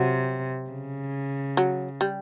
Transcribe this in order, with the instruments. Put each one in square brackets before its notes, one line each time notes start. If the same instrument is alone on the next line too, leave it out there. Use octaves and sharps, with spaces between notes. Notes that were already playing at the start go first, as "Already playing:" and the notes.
Already playing: [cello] C3 [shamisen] F#3
[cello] C#3
[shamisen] F#3
G3